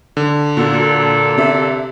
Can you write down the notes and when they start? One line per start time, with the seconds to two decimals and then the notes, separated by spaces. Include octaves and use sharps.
0.17 D3
0.57 A#2 A#3 D4 F#4 A4
1.38 C3 E5